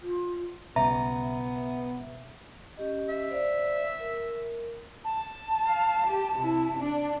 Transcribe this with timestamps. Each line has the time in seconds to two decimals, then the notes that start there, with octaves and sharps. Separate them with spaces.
0.01 F4
0.76 B1 C#3 G3 B3 E5 A#5
2.77 C#4 G4 D#5
3.09 E5
3.30 C5 D5 F5
4.00 A#4
5.04 A5
5.68 F5
6.07 G4
6.37 C3 E4
6.77 D4